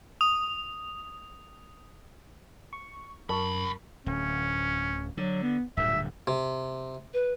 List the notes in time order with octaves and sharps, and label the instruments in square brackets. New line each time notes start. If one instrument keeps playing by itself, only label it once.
[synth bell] D#6 F7
[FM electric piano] C#6
[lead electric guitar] C2 B5 [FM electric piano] F#2 [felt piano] A#4 A5 C#6
[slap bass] D1 [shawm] C#4
[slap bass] D3 [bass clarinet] F#3
[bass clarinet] B3
[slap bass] D1 G2 D3 [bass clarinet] A#2 [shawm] E5
[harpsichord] C3
[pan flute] B4